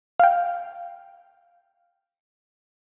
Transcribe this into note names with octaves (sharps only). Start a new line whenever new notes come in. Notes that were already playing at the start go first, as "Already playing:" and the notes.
F5 G5